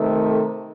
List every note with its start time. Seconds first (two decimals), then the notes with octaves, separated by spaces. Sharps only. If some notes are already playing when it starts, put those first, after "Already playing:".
Already playing: C3 D#3 A3
0.30 A4